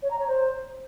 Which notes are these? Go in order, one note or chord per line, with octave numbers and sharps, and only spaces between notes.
C#5
A#5
C#5
C5